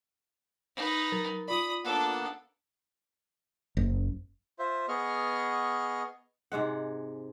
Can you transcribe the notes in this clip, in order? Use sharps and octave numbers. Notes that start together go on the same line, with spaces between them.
D#4 B4
F#3 A#4 A6
F4 D5 B5 D#6
A#3 B3 D4 A4 F#5
F#1
F4 C5 E5
B3 G#4 D#5 C#6 F6
G#2 C3 G#3 F#5